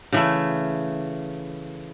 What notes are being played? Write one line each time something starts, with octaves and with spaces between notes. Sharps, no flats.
C#3 E3 A3